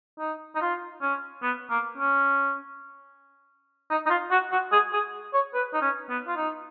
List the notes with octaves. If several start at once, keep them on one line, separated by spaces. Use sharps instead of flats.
D#4
D#4
F4
C#4
B3
A#3
C#4
D#4
D#4
F4
F#4
F#4
G#4
G#4
C#5
B4
D#4
C#4
B3
F4
D#4